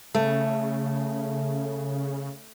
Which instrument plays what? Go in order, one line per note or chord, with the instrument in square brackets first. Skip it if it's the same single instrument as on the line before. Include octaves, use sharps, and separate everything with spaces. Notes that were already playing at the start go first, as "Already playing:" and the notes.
[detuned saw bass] C#3 [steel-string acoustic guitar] A3